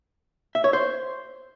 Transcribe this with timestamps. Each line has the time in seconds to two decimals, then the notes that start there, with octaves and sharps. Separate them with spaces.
0.55 E5
0.64 C#5
0.73 C5